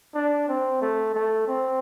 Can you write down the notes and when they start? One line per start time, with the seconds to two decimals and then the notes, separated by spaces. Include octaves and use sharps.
0.15 D4
0.48 C4
0.81 A3
1.14 A3
1.47 C4